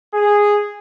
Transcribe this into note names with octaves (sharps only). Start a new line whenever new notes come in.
G#4